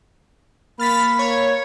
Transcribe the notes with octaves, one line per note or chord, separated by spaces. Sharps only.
A#3 B5 F6 A6 B6
C#5